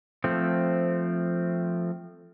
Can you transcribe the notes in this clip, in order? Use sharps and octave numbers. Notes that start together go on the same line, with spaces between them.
F3 A3 C4